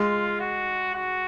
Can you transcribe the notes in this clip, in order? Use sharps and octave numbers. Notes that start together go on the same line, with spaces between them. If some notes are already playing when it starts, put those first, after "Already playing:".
Already playing: G#3 F4
F#4
F#4